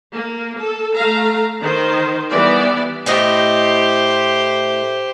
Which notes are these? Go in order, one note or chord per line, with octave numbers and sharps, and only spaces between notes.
A#3
A4
A3 F5 A#5
D#3 C5
E3 G3 B3 D5
A2 A3 G4 C5 D#5